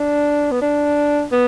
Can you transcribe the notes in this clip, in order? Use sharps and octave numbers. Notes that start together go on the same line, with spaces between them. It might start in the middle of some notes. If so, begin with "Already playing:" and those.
Already playing: D4
B3
D4
B3